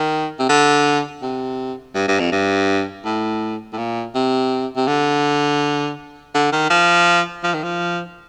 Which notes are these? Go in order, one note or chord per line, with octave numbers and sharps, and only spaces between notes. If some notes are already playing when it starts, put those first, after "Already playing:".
Already playing: D#3
C3
D3
C3
G2
G2
F2
G2
A2
A2
A#2
C3
C3
D3
D3
D#3
F3
F3
D#3
F3